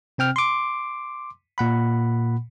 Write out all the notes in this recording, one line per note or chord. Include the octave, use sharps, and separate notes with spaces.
C3 C4 G5 F6
C6 D6
A#2 F#5 B5